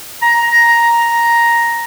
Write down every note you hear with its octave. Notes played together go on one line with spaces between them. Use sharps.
A#5